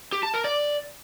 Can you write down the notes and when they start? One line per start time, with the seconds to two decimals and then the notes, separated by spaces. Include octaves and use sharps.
0.12 G4
0.23 A5
0.34 A#4
0.44 D5